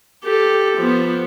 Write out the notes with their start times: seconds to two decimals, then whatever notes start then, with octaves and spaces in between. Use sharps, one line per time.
0.24 G4 A4
0.77 F3 B3